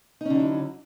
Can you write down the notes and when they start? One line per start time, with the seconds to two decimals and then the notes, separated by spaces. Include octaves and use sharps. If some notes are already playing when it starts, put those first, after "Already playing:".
0.21 D#4
0.25 C#4
0.30 D3
0.35 F#3
0.40 E4